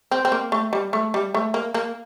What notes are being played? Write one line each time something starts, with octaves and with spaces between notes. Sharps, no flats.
C4
C4
A#3
A3
G3
A3
G3
A3
A#3
A#3